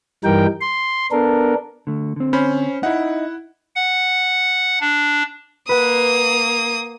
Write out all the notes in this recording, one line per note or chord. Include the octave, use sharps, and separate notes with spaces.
G2 E3 G3 D#4 A#4 G5
C6
B3 D4 A4 A#4
D3 A3
D3 C4
C#4 C5 B5
D#4 E4 D#5 E5 F#5
F#5
D4
A#3 B4 F#5 D#6